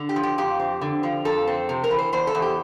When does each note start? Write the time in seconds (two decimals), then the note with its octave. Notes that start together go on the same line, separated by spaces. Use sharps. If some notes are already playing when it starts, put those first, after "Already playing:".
Already playing: D3
0.09 G4
0.16 F3
0.23 G4
0.38 F2 G4
0.60 C4
0.81 D3
1.03 F3
1.25 F2 A4
1.47 C4
1.69 C3
1.84 A#4
1.91 E3
1.98 C5
2.12 E2 C5
2.27 A4
2.35 E2
2.42 G4